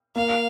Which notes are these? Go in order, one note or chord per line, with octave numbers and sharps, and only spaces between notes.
A#3 F5